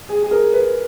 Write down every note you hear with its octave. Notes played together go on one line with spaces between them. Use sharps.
G#4
G#4
A#4
B4